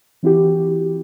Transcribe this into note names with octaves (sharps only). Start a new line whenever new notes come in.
E3 C4 E4 F#4 G4